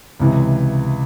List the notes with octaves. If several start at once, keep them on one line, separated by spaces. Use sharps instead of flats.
C#2 C3 E3